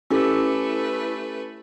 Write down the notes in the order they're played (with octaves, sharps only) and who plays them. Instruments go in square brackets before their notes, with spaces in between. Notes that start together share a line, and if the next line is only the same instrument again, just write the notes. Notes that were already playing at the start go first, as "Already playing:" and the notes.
[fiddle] A3 B4 [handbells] C#4 G4 A4 [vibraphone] E4